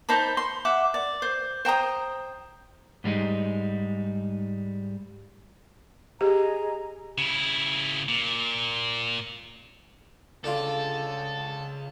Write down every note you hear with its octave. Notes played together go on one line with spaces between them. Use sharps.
D#4 C5 A5 B5
C6
E5 F#5 D6
D5
C5
C5 G5 A#5 D#6
G#2 G3 G#3 D#4
G4 G#4 D#5 A#5
C#3 E4
A#2
C#2 D3 D4 F4 A4